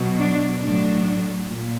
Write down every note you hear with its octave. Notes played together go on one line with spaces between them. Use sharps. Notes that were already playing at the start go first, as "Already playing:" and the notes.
Already playing: B2 F#3
D4
A2 F#3 D4
A#2